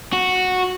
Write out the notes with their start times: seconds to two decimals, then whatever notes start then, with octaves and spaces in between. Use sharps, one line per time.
0.13 F#4